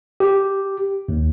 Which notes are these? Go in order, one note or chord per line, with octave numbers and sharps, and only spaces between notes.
G4
D#2